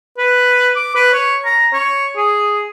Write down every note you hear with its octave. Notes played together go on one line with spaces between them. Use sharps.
B4
D6
B4
C#5
A#5
C#5
G#4